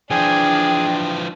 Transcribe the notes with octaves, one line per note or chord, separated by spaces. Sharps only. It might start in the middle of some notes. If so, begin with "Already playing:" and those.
E3 F3 D4 G#4 G5 G#5